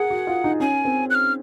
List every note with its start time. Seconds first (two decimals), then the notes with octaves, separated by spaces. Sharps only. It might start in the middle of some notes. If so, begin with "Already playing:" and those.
Already playing: G#4 A#4 F#5
0.10 F#4
0.27 F4
0.44 D#4
0.60 C#4 G#5
0.85 C4
1.10 F#6
1.15 F6